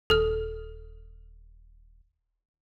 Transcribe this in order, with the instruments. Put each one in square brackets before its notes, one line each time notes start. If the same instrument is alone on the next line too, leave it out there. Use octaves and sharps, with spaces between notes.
[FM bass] D#1 [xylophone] A4 F6